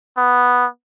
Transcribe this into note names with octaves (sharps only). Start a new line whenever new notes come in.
B3